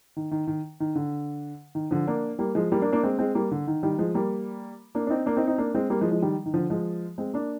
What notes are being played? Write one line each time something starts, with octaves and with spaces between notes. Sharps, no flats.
D#3
D#3
D#3
D#3
D3
D#3
D3 F3
A#3 D4
G3 A#3
F3 G#3
G3 A#3
A#3 D4
A#3 D4
G#3 C4
G#3 C4
G3 A#3
D3
D#3
D#3 G3
F3 G#3
G3 A#3
A#3 D4
D4
C4 D#4
A#3 D4
C4 D#4
C4 D#4
A#3 D4
G#3 C4
G3 A#3
F3 G#3
F3 G#3
D#3 G3
D#3
D3 F3
F3 G#3
G#3 C4
A#3 D4